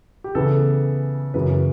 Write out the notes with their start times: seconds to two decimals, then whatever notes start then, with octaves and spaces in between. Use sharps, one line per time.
0.24 G4
0.35 C#3 E3 B3 A4
1.34 F#2 C#3 E3 B4